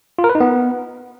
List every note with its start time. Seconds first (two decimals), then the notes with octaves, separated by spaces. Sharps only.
0.19 F4
0.24 A#4
0.29 B4
0.35 D#4
0.40 B3